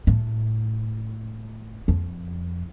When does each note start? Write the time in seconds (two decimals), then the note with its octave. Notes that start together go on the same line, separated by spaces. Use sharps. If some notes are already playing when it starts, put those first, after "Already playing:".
0.07 A2
1.88 F2